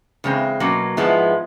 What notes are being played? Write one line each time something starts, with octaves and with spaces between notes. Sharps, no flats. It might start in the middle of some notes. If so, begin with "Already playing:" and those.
E2 C#3 G#3 C4
B2 F#3 A#3 C#4
G#2 F3 G#3 B3 E4